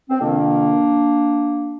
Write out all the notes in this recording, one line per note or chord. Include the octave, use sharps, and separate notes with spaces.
C4
F2 C3 D#3 A#3 D4